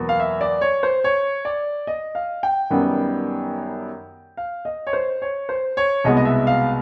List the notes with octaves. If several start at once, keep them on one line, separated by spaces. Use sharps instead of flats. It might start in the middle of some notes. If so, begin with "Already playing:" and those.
Already playing: E2 B2 F#3 A#3
F5
E5
D5
C#5
C5
C#5
D5
D#5
F5
G5
F#2 D#3 G3 B3
F5
D#5
C#5
C5
C#5
C5
C#5
C2 B2 G#3 B3 D#5
D#5
E5
F5